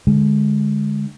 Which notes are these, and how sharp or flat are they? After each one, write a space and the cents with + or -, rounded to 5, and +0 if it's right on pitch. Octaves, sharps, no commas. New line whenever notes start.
D3 +0 G#3 +0